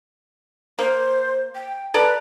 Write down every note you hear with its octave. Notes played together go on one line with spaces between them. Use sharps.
A#3 C5
G5
A4 B4 D5 A#5